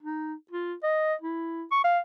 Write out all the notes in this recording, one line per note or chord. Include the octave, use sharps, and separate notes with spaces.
D#4
F4
D#5
E4
C#6
F5